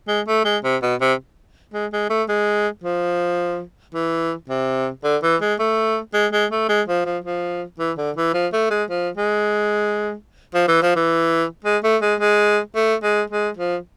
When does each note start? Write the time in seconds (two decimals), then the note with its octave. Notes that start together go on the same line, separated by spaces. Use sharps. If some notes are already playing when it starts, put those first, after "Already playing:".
0.08 G#3
0.27 A3
0.45 G#3
0.63 C3
0.82 B2
1.00 C3
1.73 G#3
1.93 G#3
2.10 A3
2.29 G#3
2.84 F3
3.94 E3
4.49 C3
5.04 D3
5.23 E3
5.41 G#3
5.59 A3
6.14 G#3
6.33 G#3
6.51 A3
6.69 G#3
6.88 F3
7.05 F3
7.24 F3
7.79 E3
7.97 D3
8.16 E3
8.34 F3
8.53 A3
8.70 G#3
8.90 F3
9.17 G#3
10.54 F3
10.68 E3
10.82 F3
10.96 E3
11.64 G#3
11.84 A3
12.02 G#3
12.20 G#3
12.75 A3
13.03 G#3
13.30 G#3
13.57 F3